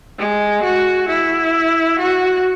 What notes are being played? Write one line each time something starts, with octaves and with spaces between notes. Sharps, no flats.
G#3
F#4
E4
F#4